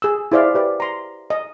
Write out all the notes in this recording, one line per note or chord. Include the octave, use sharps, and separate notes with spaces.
G#4 E6
E4 G#4 C5 D5 E5 F5
G4 B4 D5
A#5 C6
D#5